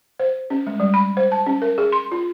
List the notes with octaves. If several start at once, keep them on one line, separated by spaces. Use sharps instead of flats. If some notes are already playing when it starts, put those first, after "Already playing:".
C5
C#4
G#3
G3
B5
C5
A5
C#4
A#4
G#4
C6
F4